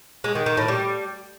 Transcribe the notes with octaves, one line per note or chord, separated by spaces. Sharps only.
G#3
D#3
D#3
A2
G3